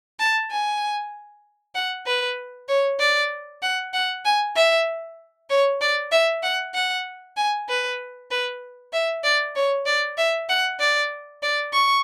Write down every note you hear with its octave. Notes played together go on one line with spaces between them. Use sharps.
A5
G#5
F#5
B4
C#5
D5
F#5
F#5
G#5
E5
C#5
D5
E5
F#5
F#5
G#5
B4
B4
E5
D5
C#5
D5
E5
F#5
D5
D5
C#6